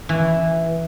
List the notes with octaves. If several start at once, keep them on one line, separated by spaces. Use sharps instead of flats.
E3